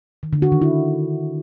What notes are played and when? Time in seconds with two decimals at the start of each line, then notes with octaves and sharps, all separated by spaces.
0.23 D#3
0.33 D3
0.42 F#4
0.52 D#3
0.62 E4